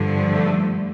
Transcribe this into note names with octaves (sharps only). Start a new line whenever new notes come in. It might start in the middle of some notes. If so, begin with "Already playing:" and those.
Already playing: G2 D3 F3
A3